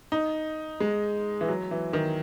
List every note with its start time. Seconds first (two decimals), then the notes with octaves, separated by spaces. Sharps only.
0.12 D#4
0.80 G#3
1.41 E3
1.48 F#3
1.71 E3
1.93 D#3